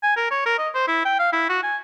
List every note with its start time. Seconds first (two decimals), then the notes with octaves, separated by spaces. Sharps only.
0.03 G#5
0.17 A#4
0.31 C#5
0.46 A#4
0.59 D#5
0.74 C5
0.88 E4
1.05 G5
1.19 F5
1.33 E4
1.49 F#4
1.63 G#5